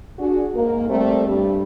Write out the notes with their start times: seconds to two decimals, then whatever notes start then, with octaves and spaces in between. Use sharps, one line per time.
0.19 D4 F#4 G#4
0.55 G#2 A#3 A#4
0.89 G3 A3 C4
1.28 G2 G3